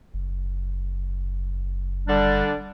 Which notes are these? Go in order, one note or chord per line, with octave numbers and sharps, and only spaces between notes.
F#1
D3 G3 D4